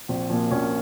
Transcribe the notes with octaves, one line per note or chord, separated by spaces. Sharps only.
A#1 C4
A#2 F3
A#1 A#3 C#4